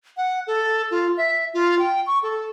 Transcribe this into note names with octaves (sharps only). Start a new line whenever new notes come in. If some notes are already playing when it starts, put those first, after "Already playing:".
F#5
A4
F4
E5
F4
G5
C#6
A4